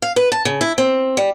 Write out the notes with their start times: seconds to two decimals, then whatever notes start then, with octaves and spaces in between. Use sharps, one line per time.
0.02 F5
0.16 B4
0.32 A5
0.45 C#3
0.61 E4
0.78 C4
1.17 G3